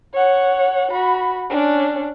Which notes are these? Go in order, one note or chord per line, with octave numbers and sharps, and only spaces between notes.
C#5 F#5
F#4 B5
C#4 D4